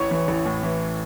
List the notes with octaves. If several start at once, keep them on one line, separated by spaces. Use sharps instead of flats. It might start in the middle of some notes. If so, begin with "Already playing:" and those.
Already playing: A1 C#5 C#6
E3
A1
A2
E3